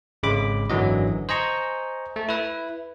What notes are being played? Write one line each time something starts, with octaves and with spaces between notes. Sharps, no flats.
G#1 C#3 G#3 B5 D6
G#1 F#2 D3 E3 F#3 D#5
C5 D#5 G#5 A#5 C#6
A3
E4 B4